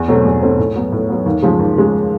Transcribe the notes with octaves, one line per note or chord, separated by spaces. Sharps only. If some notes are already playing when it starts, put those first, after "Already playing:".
Already playing: E2
B2 F#3 A3 C4
E2
B2 F#3 A3 C4
A2
F#3 B3
A2
F#3 B3
D#2
C#3 F3 G#3
D#2
C#3 F3 G#3